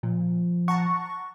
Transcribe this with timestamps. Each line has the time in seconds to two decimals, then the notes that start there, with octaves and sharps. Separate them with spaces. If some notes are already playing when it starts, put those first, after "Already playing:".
0.03 A#2 F3
0.68 F#5 A5 A#5 C#6